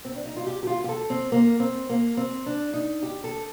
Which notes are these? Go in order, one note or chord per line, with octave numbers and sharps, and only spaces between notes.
C4
D4
D#4
F4
G4
G4
F4
G4
A4
C4
A#3
C4
A#3
C4
D4
D#4
G4
A4